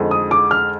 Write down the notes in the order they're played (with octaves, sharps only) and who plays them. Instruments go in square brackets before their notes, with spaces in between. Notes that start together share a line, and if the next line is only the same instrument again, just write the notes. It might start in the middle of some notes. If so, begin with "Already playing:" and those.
Already playing: [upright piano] F2 D3 G#3 D#4 G#4
[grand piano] D#6
D6
F6